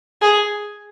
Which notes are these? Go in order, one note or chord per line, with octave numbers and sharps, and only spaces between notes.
G#4